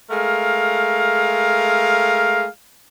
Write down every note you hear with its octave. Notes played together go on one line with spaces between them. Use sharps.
G#3 A3 A#4 F5